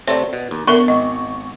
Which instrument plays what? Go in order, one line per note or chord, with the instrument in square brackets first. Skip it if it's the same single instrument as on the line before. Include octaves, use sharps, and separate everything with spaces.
[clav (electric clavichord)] C3 A3 C4 [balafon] C#5 D5
[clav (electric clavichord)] B2
D#2
[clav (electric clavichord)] D3 [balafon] B3 A#4 E5 [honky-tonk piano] C#6
[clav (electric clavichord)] G#1 [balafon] D#5